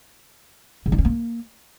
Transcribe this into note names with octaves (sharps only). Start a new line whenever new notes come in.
C#3
D4
C#4
A#3